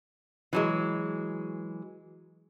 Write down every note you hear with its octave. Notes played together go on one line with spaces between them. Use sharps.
E3 F#3 G#3